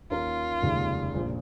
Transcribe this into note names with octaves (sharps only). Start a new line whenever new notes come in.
D#2 D#3 C#4 F4 A#4
F1 D#2 C#3 G#3 D#4
A#1 A#2 F3